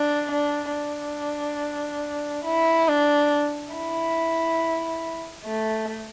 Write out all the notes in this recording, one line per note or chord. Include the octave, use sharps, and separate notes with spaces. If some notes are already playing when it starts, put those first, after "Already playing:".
Already playing: D4
D4
D4
E4
D4
E4
A3